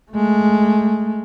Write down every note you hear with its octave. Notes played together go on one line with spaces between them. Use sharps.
G#3 A3